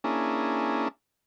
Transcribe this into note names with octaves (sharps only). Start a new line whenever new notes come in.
A#3 C#4 D4 E4 G#4